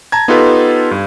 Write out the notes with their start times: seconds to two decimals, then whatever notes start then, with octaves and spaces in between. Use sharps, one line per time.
0.12 A5 A#5 G#6
0.28 B3 D#4 F4 G4 A4 B4
0.91 G2